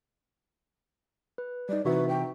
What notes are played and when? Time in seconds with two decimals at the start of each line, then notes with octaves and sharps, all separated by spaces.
1.38 B4
1.69 G3 D#4 D5
1.85 C3 E3 C4 D#4 F#4 B4 E5
2.09 G5